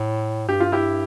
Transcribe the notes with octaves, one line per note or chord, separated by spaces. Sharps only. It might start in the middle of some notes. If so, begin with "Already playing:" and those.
Already playing: A2
G2 G4
F4
E4 G4